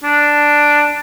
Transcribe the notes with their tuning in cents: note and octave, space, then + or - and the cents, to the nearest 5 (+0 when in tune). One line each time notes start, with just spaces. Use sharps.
D4 +0